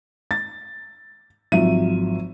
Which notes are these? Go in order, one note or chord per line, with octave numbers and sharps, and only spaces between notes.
A6
G#1 F3 F#3 E5 D#7